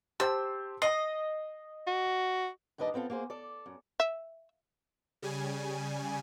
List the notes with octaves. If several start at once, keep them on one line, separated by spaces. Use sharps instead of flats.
G4 C5 A5 E6
D#5 C7
F#4
G2 D#3 D4 B4 D#5 A5
B3 C4 F4 A4
A#3 F#4 G#4 C5
A4 D5
F#2
E5
C#3 G3 G#5